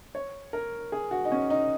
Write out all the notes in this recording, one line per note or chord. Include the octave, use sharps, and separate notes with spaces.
C#5
A#4
G#4
F#4
D#4
C#4
D#4